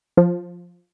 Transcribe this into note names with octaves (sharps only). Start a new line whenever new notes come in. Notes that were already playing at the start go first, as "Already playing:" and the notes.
F3